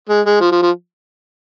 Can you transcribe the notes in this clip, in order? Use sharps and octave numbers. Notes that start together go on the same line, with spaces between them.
G#3
G#3
F3
F3
F3